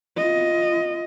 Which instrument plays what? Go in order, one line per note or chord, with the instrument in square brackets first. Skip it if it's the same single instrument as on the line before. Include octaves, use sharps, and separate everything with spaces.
[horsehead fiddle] F4 D#5